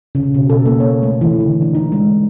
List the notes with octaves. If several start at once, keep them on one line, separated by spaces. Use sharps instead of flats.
C#3
B2
A4
A#3
C#5
A3
E3
D3
D4
D#4
G#3